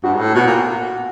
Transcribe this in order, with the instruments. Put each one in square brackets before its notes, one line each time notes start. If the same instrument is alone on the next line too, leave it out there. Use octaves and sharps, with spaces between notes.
[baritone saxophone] G2 [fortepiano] F#4
[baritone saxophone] G#2
A2
[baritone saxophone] B2 [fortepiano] F#4
[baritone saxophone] A#2